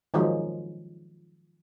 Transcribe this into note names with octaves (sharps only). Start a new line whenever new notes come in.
D#3 F3 F#3 G#3